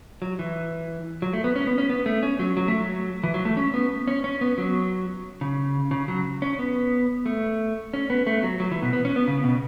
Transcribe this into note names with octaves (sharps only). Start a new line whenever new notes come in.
F#3
E3
F#3
A3
B3
C#4
B3
C#4
B3
A3
C#4
F#3
F#3
A3
F#3
E3
F#3
A3
C#4
B3
C#4
C#4
B3
F#3
C#3
C#3
F#3
C#4
B3
A3
C#4
B3
A3
F#3
F#3
E3
B2
B3
C#4
B3
C#3
B2